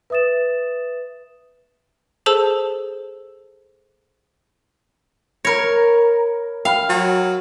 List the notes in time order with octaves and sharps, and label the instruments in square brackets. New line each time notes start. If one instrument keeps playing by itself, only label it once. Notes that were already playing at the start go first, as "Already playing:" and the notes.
[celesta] B4 E5 D#6 A6 E7
[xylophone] G#4 A4 C5 A5 E6
[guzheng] A#4 C#5 [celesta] A#5 B5 A#6
[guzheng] F5 [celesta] G5 B5 F6
[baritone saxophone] F#3